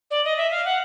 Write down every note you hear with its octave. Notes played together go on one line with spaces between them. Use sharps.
D5
D#5
E5
F5
F#5